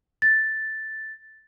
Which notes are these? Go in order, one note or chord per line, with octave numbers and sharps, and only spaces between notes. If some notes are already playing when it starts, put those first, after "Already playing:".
A6